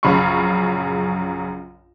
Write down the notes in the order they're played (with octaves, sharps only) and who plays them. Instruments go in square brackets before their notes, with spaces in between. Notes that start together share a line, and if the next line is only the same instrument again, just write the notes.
[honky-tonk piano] A#1 F#2 C#3 F5 B5 C#6